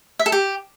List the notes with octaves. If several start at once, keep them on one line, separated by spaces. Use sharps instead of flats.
E5
A4
G4